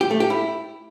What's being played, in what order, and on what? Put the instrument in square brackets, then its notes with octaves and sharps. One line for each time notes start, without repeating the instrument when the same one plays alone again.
[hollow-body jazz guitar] G4
A3
G4
E4